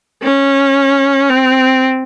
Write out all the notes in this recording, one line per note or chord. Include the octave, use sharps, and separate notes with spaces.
C#4
C4